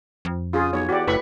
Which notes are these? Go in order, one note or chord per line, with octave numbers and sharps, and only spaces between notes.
F2
C#3 F4 G#4
B1 C#5
E2 F#4 G4 D5
F#1 A2 B4 B5 C#6